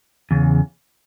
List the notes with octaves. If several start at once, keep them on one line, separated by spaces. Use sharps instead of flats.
E2 C#3